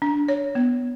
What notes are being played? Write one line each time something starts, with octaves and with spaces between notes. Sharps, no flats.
D4
C#5
B3